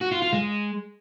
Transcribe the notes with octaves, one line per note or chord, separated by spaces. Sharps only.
F#4
F4
F4
G#3